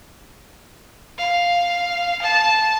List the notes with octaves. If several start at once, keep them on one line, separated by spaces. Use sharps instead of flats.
F5
A5